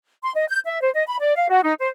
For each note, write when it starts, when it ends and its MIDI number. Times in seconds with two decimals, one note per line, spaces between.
0.23 0.31 84
0.35 0.45 75
0.49 0.59 91
0.66 0.80 76
0.81 0.89 72
0.94 1.04 75
1.07 1.17 83
1.19 1.33 74
1.36 1.48 77
1.49 1.61 66
1.63 1.73 63
1.79 1.89 72